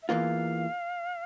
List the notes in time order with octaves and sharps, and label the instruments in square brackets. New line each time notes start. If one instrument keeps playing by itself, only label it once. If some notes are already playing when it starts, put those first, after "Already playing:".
[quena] E5
[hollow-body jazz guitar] E2 E3 A#3 F4 [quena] F5